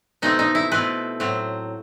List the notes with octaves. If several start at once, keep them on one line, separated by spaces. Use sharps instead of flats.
B2 A3 C4 D#4
D#4
E4
B2 A3 C4 B4
A2 F#3 C4